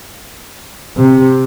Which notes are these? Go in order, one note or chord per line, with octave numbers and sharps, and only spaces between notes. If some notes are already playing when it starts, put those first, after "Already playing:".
C3